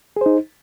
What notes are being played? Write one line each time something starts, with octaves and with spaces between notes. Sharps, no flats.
D#4 G#4 C5